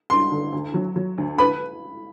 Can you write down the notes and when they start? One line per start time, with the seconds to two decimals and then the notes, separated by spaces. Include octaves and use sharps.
0.10 G2 C6
0.31 D3
0.52 D2
0.74 F#3
0.96 F#3
1.18 D2
1.38 B4 B5